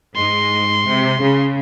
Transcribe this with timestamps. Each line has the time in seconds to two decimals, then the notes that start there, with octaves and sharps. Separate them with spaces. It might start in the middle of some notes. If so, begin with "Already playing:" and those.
0.16 G#2 G#3 C6
0.86 C3
1.21 C#3